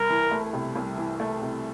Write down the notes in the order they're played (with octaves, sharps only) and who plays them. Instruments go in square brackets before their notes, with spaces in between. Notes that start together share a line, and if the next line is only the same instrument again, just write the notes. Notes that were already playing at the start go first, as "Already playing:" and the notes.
Already playing: [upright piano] C2 [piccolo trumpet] A#4
[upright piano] E3
A3
C3
C2
E3
A3
C3